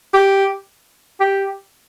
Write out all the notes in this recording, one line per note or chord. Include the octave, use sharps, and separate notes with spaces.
G4
G4